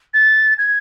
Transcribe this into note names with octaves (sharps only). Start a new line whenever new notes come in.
A6
G#6